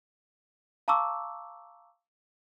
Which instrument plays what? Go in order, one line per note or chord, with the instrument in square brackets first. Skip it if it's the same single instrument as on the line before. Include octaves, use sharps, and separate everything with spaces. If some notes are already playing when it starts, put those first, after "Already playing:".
[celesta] F5 A5 A#5 C#6 D6 E6